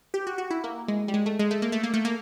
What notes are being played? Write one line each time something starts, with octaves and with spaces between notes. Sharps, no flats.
G4
F#4
F#4
E4
A#3
G#3
G3
G#3
A3
G#3
A3
A#3
A3
A#3
A3
A#3